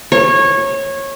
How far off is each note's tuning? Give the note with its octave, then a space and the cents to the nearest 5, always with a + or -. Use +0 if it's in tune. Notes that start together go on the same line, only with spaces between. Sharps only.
C#5 -20